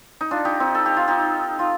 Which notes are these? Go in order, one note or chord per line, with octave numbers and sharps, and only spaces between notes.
D#4
D4 F4
D#4 G4
C4 D#4
A4
G4
F4
D#4 G4
F4